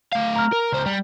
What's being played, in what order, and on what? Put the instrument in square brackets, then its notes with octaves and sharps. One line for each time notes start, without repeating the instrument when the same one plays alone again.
[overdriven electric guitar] A3 F5
[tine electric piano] A#5 F6
[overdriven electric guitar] A#4
C#2 C5
G3